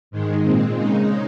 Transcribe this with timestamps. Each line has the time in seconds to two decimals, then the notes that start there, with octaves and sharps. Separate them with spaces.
0.11 G#2 D#3 G#3
0.43 A#2 G#3 C4
0.76 C#3 G#3 D#4